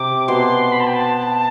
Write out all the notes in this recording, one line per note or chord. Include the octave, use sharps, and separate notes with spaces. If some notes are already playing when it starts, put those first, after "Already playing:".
Already playing: C3 D6
B2 C6
B5
A5
G5
A5